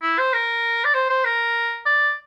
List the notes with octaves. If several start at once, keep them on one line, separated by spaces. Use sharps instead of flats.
E4
C5
A#4
D5
C5
C5
A#4
D5